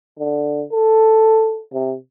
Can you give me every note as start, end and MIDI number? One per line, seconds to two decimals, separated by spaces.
0.19 0.63 50
0.72 1.61 69
1.73 1.95 48